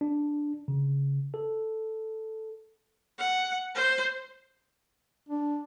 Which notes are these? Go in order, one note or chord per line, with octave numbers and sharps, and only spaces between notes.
D4
C#3
A4
F#5
C5
D4